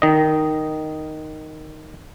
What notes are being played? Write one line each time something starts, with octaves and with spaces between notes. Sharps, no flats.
D#3 D#5